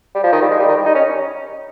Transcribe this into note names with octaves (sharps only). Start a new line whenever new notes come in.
G3
F3
D#3
G3
G#3
G3
D#3
G3
D#4
C#4